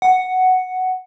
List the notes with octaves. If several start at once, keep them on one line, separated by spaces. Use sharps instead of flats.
F#5